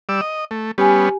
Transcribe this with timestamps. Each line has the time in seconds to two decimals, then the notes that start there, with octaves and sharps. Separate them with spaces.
0.09 G3 D5 E6
0.21 D#5
0.51 A3
0.78 G3 B3 C#4 G4 G#5